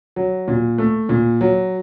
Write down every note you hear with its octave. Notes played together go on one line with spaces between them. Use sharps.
F#3
A#2
A3
A#2
F#3